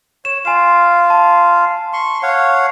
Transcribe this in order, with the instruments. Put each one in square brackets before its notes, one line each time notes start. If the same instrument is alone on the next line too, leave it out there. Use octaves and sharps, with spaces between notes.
[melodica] C#5 [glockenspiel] E7
[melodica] F4 F5 [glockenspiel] G#5 E7
[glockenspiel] A5
[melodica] C6 C#6
C#5 F5 F#5